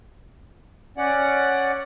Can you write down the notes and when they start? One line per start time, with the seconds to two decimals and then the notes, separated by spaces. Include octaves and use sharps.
0.97 C#4 D5 F#5